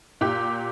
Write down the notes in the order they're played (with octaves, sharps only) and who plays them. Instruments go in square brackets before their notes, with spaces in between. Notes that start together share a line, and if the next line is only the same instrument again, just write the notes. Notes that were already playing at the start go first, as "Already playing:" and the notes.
[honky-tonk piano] A#2 G4